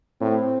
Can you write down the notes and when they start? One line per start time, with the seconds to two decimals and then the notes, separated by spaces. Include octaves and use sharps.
0.21 A2 C4